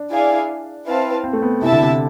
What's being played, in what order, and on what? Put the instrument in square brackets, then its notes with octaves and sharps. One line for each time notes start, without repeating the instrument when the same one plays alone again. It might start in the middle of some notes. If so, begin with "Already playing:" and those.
Already playing: [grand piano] D4
[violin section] E4 G#4 D5 F5 G#5
C4 E4 B4 F5 A5
[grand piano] C4
A3
B3
[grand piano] C3 [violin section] E4 A4 E5 A5
[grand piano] D3
C3